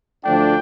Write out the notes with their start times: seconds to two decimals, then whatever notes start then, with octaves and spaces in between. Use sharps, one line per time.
0.25 D2 D3 F3 A3 D4 G5